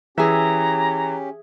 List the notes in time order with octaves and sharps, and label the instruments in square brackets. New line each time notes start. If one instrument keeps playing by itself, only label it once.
[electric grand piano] E3 [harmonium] C#4 G4 [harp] G#4 E5 [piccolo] A#5